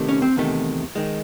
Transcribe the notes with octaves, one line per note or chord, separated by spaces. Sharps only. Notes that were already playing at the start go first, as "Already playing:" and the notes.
Already playing: C3 D#3 A3
C#4
C4
E2 C3 D#3 A3
D#3 G#3